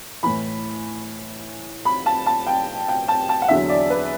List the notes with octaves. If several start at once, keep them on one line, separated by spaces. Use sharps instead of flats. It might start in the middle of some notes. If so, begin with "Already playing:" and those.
A2 E3 B5
B5
A5
A5
G5
G5
A5
A5
F#5
E2 D3 F#3 E5
D5
B4